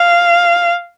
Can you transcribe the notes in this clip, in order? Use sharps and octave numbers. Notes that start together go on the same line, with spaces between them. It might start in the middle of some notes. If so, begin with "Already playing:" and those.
Already playing: F5